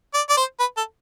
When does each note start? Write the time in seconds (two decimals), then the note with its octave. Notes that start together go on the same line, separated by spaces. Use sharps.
0.14 D5
0.29 D5
0.37 C5
0.60 B4
0.77 A4